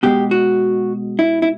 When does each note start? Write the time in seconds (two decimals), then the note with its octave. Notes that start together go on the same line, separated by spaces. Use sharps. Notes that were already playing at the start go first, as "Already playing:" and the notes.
0.03 B2 G#3 G4
0.31 F#4
1.19 E4
1.42 E4